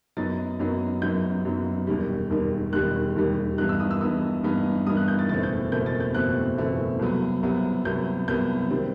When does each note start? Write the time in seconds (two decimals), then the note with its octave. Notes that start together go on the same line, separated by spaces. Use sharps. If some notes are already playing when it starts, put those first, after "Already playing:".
0.17 F#2 F#3 B3 D#4 A6
0.59 F#2 F#3 B3 D#4
1.02 F#2 F#3 B3 D#4 G6
1.45 F#2 F#3 B3 D#4
1.87 E1 D#2 D#3 G3
2.30 E1 D#2 D#3 G3
2.73 E1 D#2 D#3 G3 F#6
3.16 E1 D#2 D#3 G3
3.58 G2 E3 B3 D#4 F#6
3.69 E6
3.80 D#6
3.91 E6
4.01 G2 E3 B3 D#4 E6
4.44 G2 E3 B3 D#4
4.86 G2 E3 B3 D#4 D#6
4.97 F#6
5.08 G6
5.19 A6
5.29 F#1 E2 B2 A3 C4 A6
5.43 G6
5.72 F#1 E2 B2 A3 C4 G6
5.86 A6
6.00 G6
6.14 F#1 E2 B2 A3 C4 F#6
6.57 F#1 E2 B2 A3 C4
6.99 C2 C3 F#3 B3
7.43 C2 C3 F#3 B3
7.85 C2 C3 F#3 B3 G6
8.28 C2 C3 F#3 B3 G6
8.70 D#3 G3 C4